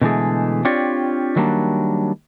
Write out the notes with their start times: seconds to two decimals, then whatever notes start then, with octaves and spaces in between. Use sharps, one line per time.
0.01 B2 D3 E3 G#3 A3 G#4
0.65 C4 D4 F4 G4 C#5 D5
1.36 D#3 F#3 G3 A#3 D4